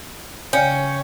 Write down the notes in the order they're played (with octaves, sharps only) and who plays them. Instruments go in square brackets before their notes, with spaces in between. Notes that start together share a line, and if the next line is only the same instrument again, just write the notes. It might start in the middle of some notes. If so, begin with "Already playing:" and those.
[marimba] C#3 F5 [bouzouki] C#4 [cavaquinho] G5 [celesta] G#5 G6 C#7